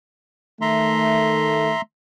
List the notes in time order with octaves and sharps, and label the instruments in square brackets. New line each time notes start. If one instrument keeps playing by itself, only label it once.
[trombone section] D#3 A3 [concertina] E5 A#5 C6